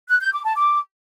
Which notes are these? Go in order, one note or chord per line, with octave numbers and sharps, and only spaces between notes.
F#6
G6
D6
A5
D6